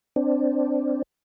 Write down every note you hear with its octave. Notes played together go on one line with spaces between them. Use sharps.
C4 D4